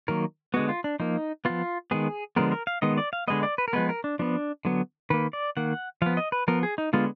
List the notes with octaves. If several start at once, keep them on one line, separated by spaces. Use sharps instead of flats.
D#3 F#3 A#3 A#4
D3 G#3 B3 F#4
F4
D4
F3 A#3 D#4
F3 B3 F4
D#3 G#3 B3 G#4
D3 F3 G#3 B3 A#4
A#4
F5
D#3 G#3 B3 D#5
D5
F5
D3 G#3 B3 D#5
D5
B4
A#4
F3 G#3 B3 B4
A#4
D4
F3 B3 D4
D3 F#3 B3
D#3 A#3 B4
D5
D#3 A#3 F#5
F3 B3 F5
D#5
B4
F3 B3 A#4
G#4
D#4
D3 G#3 B3 F4